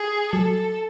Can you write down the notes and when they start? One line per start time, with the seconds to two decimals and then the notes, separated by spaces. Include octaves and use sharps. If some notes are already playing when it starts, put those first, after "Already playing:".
Already playing: G#4
0.33 F#3 A4